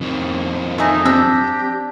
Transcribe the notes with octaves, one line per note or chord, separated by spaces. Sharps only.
F2 D#3
A3 D#4 G#4
C4 D4 G4 E6 A#6